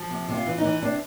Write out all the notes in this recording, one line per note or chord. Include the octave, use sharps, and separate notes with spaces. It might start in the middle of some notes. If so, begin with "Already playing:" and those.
Already playing: F3
C3
C3
F4
E3
D#4
E3
C3 D4